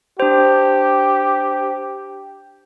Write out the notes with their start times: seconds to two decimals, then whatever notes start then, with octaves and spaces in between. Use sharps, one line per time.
0.20 D4 G4 C5